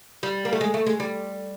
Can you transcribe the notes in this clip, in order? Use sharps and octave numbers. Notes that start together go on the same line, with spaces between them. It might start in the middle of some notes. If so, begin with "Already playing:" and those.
G3
A#3
A3
G#3
A3
G#3
G3